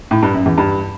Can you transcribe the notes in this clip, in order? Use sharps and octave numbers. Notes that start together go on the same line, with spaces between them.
A2
G2
F#2
E2
G2